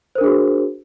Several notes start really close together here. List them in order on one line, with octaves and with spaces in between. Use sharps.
C5 A#4 D4 G#4 F#4